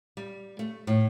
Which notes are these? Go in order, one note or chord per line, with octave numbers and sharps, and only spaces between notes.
G3
A3
A2